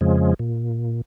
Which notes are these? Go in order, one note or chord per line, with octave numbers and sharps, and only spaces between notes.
F2 C#3 F3 G#3
A#2